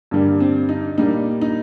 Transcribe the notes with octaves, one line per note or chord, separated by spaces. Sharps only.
G2 D3 G3 A#3
C4
D#4
A#2 G3 A#3 D#4
D#4